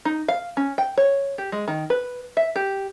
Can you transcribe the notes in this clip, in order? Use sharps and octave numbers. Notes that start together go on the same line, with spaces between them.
D#4
F5
C#4
G5
C#5
G4
G#3
D#3
B4
E5
G4